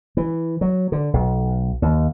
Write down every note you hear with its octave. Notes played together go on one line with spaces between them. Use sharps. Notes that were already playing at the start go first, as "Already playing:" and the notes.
E3
F#3
D3
B1
D#2